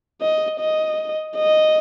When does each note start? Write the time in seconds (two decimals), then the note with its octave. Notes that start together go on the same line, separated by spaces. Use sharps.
0.22 D#5
0.60 D#5
1.36 D#5